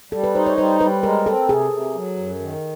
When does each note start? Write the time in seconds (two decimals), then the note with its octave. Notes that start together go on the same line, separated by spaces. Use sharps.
0.12 G3 A4
0.24 B4
0.35 D#4 C5
0.46 C#5
0.58 G3 C5
0.80 G3 B4
1.03 G#3 A#4
1.26 C4 A4
1.49 C3 G#4
1.72 C3
1.95 F#3
2.17 F#2
2.40 D#3